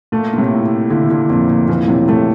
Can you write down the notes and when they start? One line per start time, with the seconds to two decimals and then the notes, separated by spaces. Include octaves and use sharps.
0.12 A#2 A3
0.34 A#2
0.38 A2 C3
0.51 E4
0.90 A#2 D3 E4
1.10 A#2 D3
1.30 F2 A#2
1.50 A#2
1.68 A#2 E3
1.80 A#2
1.88 A2 C3
2.08 A2 C3 A3